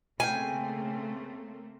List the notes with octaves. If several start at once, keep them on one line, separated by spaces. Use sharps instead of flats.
C#3 A3 A#3 C4 F5 G5 G#5